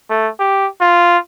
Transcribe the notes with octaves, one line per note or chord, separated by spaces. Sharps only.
A3
G4
F4